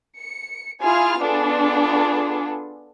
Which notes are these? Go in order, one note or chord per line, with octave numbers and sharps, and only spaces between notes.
C#7
E4 F4 G#4 G#5 F6
B3 D4 F4 G#4 A4